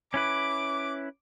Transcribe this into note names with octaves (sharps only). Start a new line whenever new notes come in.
C#4 E4 B4 D6